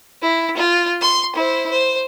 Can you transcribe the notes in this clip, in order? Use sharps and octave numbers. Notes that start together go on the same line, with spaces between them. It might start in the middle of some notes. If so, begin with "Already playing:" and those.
E4
F4
C6
E4 C5
C5